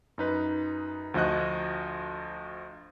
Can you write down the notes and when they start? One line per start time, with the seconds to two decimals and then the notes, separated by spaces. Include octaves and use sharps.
0.18 F#2 D#4 B4
1.14 D2 F3 F#4 D#5 F#6